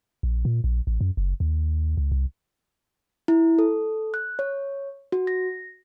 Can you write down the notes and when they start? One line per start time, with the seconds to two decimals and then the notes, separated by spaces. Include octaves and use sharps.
0.23 A#1
0.45 A#2
0.64 A#1
0.87 A1
1.01 F#2
1.17 F#1
1.40 D#2
1.97 C#2
2.12 C2
3.28 E4
3.58 A4
4.14 F#6
4.39 C#5
5.12 F#4
5.27 A#6